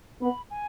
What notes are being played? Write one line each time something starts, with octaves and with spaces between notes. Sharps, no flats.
B3 B5
G#5